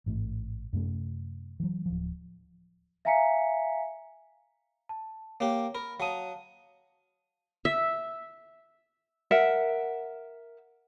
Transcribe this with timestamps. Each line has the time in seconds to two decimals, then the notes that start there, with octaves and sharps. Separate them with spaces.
0.06 A1 G#2 A3
0.73 F#2 C3 A3 C#4
1.60 E3 F#3
1.86 D1 F3
3.05 E5 F5 G#5 A#5 B6 C#7
4.89 A5
5.40 A#3 G4 C#5
5.75 A#4 B5
6.00 F#3 F5 A5 D#6
7.65 E5
9.31 A#4 E5 F#5